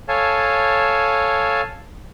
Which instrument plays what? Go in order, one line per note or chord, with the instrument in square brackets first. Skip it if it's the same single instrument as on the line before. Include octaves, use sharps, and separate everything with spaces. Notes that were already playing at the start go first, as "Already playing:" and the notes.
[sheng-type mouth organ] A4 C#5 F5 G#5 A5